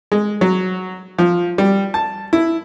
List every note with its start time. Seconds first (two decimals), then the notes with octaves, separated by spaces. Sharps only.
0.12 G#3
0.41 F#3
1.18 F3
1.58 G3
1.94 A5
2.33 E4